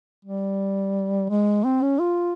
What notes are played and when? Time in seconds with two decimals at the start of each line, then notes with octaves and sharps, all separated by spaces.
0.25 G3
1.29 G#3
1.64 C4
1.82 C#4
1.99 F4